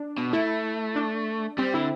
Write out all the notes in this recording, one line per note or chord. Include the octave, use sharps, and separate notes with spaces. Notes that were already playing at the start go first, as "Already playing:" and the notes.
Already playing: D4
B2
A3 E4
D4
G3 C4
D3 E4